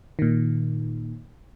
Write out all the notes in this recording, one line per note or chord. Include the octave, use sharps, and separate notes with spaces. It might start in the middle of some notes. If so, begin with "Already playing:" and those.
A#2 D#3